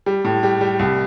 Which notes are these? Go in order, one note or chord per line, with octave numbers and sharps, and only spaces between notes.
G3
A2
G3
G3
C2